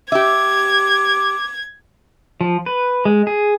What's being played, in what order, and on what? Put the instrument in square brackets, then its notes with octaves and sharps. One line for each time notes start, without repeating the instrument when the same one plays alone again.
[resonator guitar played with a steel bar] G4 E5 [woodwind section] D6 [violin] G#6
[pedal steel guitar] F3
B4
G#3
G#4